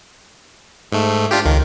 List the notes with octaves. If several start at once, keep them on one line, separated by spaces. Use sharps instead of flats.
G#2 A3
D4 F4 G4
C#2 D#3